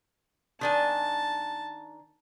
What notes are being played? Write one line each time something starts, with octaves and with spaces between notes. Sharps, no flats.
D#3 D4 G#5 A5